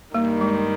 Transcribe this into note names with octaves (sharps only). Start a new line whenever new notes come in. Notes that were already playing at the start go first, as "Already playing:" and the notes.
G2 D#3 G3 A#3
G#3